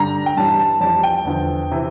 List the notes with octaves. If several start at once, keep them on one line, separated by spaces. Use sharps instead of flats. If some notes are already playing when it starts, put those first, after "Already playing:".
Already playing: G2 D3 G3 A#5
G5
G2 E3 G3 A5
A5
F2 E3 G3 A5
G5
E2 D3 F3
C3 E3